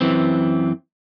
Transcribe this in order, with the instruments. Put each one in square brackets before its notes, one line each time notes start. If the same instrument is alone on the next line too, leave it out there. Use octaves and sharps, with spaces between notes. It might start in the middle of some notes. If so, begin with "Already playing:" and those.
[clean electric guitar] F#2 E3 C4